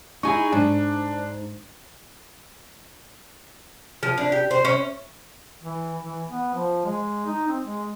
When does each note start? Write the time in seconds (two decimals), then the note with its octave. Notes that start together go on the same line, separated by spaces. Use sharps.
0.23 D#4 E4 G#4 G#5 C#6
0.52 G#2 D4
4.03 F3
4.18 D4
4.32 G4
4.51 C5
4.65 C#4
5.63 E3
6.02 E3
6.30 B3
6.55 F3
6.85 G#3
7.27 D#4
7.48 C4
7.63 G#3